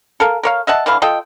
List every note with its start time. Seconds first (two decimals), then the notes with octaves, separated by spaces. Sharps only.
0.20 A4 A#4 F5
0.43 A#4 C#5 F5
0.67 D#5 E5 F#5 A5
0.86 D3 E3 B4 F5
1.02 F4 A4 D#5 G5